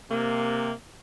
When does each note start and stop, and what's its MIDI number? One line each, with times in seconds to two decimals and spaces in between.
0.11 0.72 48
0.11 0.72 58